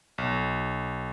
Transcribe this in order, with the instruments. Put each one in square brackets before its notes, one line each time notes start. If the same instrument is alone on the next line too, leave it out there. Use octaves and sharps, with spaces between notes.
[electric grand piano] B1